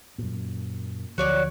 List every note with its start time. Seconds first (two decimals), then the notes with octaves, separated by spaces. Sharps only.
0.18 F#2 A#2
1.18 D2 F3 F#3 F#4 C#5 D5